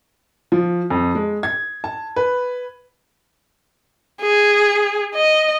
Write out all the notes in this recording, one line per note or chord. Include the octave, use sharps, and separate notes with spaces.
F3
F2
G#3
G#6
A5
B4
G#4
D#5